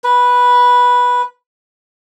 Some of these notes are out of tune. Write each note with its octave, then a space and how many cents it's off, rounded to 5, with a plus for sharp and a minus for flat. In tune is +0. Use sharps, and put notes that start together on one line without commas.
B4 -10